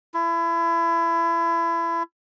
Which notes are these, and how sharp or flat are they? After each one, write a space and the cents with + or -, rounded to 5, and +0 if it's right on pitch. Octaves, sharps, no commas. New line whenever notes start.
E4 +30